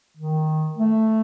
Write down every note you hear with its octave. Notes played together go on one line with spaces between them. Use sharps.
D#3
A3